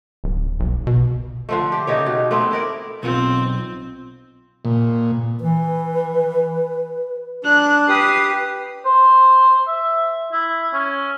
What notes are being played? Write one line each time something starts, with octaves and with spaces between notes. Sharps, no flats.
D1
B1
B2
D3 F3 A3
G4
C#3 D#4 G4 C#5
B2
A3 B3 C4 B4
E4 A#4 D5
B1 C4 F4
A#2
E3 B4
D4 F#6
G4 B4 D#6 C7
C5
E5
E4
C#4